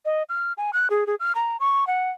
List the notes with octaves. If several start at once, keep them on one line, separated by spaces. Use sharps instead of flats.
D#5
F6
G#5
F#6
G#4
G#4
F6
A#5
C#6
F#5